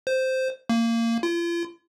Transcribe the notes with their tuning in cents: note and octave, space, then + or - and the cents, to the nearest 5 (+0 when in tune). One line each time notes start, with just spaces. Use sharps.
C5 -5
A#3 -20
F4 -40